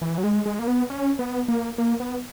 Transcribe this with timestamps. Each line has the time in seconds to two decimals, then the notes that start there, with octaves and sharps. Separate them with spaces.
0.02 E3
0.18 F#3
0.24 G#3
0.46 G#3
0.59 A#3
0.67 B3
0.90 C#4
1.19 B3
1.48 A#3
1.78 A#3
2.00 B3